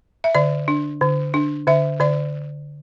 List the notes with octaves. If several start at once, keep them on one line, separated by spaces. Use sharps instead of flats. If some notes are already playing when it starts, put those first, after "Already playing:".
E5
D3 D5
D4
D3
D4
D3 E5
D3 D5